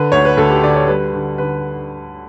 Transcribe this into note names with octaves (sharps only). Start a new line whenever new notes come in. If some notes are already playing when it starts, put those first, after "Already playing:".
Already playing: D3 B4
D2 C#5
B4
D2 A4
G4
D3 D5
C#5
G3 B4
D3
D3 B4